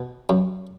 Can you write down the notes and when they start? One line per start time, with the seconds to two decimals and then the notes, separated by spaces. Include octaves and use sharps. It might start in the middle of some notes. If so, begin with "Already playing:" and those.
Already playing: B2
0.29 F#2